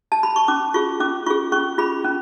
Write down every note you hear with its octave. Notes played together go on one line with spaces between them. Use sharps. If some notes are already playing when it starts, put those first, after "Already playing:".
A5
B5
C#6
C#4 D6
F4 G#4 C#6
C#4 D6
F4 G#4 C#6
C#4 C#6
F4 G#4 B5
C#4